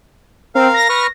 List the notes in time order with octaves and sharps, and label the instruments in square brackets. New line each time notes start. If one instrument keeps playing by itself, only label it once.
[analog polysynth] C4 [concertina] A#4 F5
[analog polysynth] A#6
[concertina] B4 C#6 F6